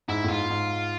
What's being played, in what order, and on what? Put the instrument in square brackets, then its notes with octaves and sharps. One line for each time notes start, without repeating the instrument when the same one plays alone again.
[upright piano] G#2 [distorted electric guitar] E4
[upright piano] A2
[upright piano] G#2 [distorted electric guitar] F4
[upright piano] G#2